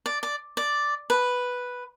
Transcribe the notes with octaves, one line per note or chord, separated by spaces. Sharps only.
D5
D5
D5
B4